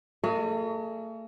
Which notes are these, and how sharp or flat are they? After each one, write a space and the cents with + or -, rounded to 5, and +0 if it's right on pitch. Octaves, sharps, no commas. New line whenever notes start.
A3 +45 G#4 +45 D#5 +0